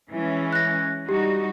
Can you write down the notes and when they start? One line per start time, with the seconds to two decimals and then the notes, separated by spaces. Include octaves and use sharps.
0.11 E3 G#3 C#4
0.53 F#6 A#6
1.09 G3 D#4 F#4 G4